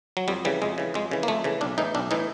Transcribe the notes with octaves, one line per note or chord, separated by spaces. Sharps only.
F#3
F2 G3
C#3 E3 G3
F2 G#3
C#3 E3
F2 G#3
C#3 E3
A#3
F2 A3
C#3 E3
B1 D4
A2 E3 D#4
B1 D4
A2 E3 D#4